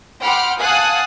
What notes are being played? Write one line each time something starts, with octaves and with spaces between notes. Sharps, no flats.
F#5 G5 B5 C6 D6 F6
F5 F#5 G#5 A5 D#6 F#6